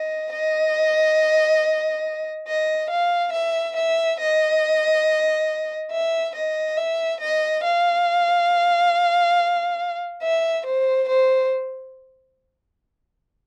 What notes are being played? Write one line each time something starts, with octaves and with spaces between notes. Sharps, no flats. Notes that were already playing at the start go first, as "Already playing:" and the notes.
Already playing: D#5
D#5
D#5
F5
E5
E5
D#5
E5
D#5
E5
D#5
F5
E5
C5
C5